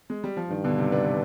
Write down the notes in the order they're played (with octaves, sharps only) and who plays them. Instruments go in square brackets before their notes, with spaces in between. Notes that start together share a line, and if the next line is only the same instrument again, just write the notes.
[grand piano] G#3
G3
F3
[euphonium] G2 [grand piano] D#3
[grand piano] B2 D3
C3 D#3
B3 D4